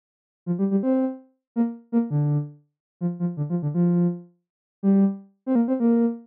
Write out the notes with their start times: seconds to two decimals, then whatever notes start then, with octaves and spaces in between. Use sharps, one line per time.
0.46 F3
0.59 G3
0.71 G3
0.83 C4
1.56 A#3
1.92 A#3
2.10 D3
3.01 F3
3.20 F3
3.37 D3
3.50 F3
3.62 D3
3.74 F3
4.83 G3
5.46 C4
5.55 A#3
5.68 C4
5.80 A#3